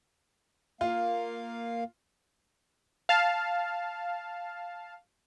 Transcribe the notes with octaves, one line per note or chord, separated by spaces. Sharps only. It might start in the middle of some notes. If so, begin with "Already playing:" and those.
A#3 F4 F5
F5 A5